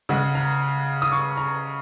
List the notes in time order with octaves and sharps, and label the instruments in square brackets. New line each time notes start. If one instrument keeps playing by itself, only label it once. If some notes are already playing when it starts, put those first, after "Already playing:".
[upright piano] C#3 G#3 F#5
A#5
D#6
C#6
A#5